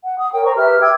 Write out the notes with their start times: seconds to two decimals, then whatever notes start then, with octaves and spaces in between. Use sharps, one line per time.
0.05 F#5
0.19 D#6
0.33 A#4 C#5 G5
0.44 C5 A#5 C#6
0.56 G4 B4 E5 F6
0.81 G5 D6 E6 G#6